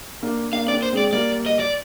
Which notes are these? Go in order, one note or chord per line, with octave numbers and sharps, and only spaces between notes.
A#3 D4
A#3 D4 F5
C4 D5
A#3 D4
C5
G#3 C4 D5
G3 A#3 D5
D#5
D5